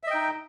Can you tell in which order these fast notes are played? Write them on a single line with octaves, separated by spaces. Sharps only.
E5 D#5 G5 D#4